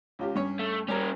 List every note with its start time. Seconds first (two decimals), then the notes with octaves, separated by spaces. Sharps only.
0.19 C#2 F4 G4
0.35 G2 C#4 C#5
0.59 A3
0.88 G3 A#3 C#4 A#5